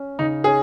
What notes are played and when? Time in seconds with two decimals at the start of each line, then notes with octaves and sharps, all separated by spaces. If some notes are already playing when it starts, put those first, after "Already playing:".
Already playing: C#4
0.19 C#3 D#4
0.44 C#4 G#4